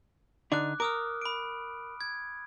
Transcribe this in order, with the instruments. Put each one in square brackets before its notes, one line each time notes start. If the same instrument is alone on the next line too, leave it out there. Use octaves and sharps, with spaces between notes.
[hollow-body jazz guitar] D3 D4 D#4 [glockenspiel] D6 F#6
[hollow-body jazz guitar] A#4 [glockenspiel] D6 D#6 F6
[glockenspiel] B5 D7
G#6